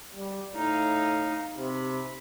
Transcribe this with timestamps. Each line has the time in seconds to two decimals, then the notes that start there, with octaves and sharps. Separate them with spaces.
0.15 G3
0.54 A2 D#4 F5
1.58 C3 B5